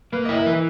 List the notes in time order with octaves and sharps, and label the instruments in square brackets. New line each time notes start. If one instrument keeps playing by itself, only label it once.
[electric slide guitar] A#3 [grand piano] B4
[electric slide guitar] E4 [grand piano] D#5
[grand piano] A#4
[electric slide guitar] E3 [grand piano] B4